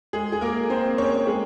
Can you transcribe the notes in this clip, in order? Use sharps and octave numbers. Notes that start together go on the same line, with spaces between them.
G#3 G#4
G#4
A#3 A#4
C4 C5
C#4 C#5
G#3 G#4